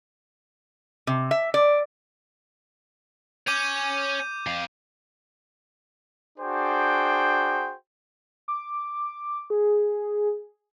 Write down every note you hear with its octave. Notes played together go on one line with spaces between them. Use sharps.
C3
E5
D5
C#5 G#5 D6 G6 D#7
F2 F5
D4 F#4 G#4 C5 G5
D6
G#4